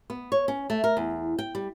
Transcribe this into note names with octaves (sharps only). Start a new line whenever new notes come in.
B3
C#5
C#4
A3
A#4
E2
G5
G3